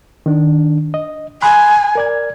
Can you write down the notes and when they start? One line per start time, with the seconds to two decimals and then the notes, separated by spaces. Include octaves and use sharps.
0.26 D#3 D4
0.94 D#5
1.42 G#5 B5 C6 F#6
1.95 A#4 D5 G#6